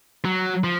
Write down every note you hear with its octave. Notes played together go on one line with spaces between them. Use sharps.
F#3
F3